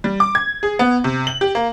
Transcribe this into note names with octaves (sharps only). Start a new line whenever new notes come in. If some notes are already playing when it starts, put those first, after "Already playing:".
G3
D6
G#6
G#4
B3
C3
F#7
G4
A#3